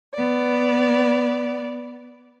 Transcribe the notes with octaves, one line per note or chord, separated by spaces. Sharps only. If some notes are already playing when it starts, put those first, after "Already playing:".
B3 D5